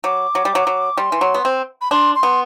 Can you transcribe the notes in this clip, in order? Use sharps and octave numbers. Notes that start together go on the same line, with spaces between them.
F#3 D6
F#3
G3
F#3
F#3
G3 C6
E3
F#3
B3
C4
B5
D4 C6
C6
B3